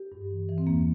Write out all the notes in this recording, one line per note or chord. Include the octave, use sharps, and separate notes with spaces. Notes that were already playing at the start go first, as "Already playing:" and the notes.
Already playing: G4
G2
E3
E3
C4
E2 A#3